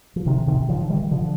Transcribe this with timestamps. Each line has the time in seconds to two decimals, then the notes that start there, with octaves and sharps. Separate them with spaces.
0.16 F3
0.26 C3 D#3
0.47 C3 D#3
0.69 D3 F3
0.90 D#3 G3
1.11 D3 F3